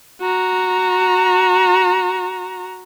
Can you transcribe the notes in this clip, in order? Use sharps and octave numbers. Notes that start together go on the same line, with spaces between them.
F#4 A#5